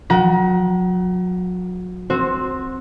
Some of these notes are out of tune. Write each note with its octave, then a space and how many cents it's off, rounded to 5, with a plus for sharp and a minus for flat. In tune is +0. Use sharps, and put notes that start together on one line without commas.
F#3 -35 F#5 +35 A#5 +35
C4 +0 F#4 -5 C5 +15